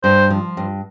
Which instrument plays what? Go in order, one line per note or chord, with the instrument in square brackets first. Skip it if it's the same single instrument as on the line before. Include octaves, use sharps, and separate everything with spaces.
[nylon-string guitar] G2 [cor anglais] C5
[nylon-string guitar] F3
G2